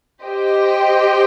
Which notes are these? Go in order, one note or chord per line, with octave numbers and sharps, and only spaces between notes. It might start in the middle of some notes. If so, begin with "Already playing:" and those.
G4 C5 D#5 G5